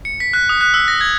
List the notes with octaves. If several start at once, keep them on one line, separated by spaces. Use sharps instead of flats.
C#7
B6
F#6
D#6
F#6
E6
A#6
G#6